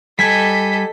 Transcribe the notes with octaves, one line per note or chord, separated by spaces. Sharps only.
G3 A4 D#5 G#5 B6